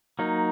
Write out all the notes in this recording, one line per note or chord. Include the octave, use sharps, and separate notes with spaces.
F#3 A#3 D#4